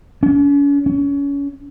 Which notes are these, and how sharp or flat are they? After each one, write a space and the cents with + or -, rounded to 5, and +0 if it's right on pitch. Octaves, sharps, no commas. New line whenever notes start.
C#4 +40
C#4 +30